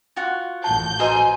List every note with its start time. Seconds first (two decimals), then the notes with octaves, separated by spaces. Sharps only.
0.16 F4 F#4
0.64 A1 F#5 A5 G6
1.00 F#4 B4 C5 D#5 G#5 A#5 C6